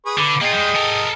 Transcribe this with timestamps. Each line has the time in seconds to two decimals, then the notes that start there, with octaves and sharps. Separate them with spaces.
0.06 G#4 B4 C#6
0.18 D3 B4 D6
0.41 A#3 F4 G#4 D#5 G5
0.54 G3 G#3
0.76 A4 A#4